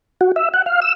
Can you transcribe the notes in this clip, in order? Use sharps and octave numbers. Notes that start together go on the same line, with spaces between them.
F#4
E5
F#5
F5
E6